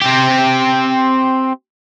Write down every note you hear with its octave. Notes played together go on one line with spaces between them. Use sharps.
C4 G4